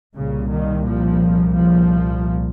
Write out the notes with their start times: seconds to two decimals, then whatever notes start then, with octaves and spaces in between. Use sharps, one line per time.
0.15 C2 A#2 C#3
0.50 D#3
0.85 F3
1.54 F3